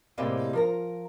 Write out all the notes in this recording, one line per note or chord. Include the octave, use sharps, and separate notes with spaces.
A2 C3 G3 G#3 A#3
F3 A#4 A#5